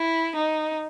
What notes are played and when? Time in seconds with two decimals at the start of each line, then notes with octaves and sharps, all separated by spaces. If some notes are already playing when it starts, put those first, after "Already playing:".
Already playing: E4
0.36 D#4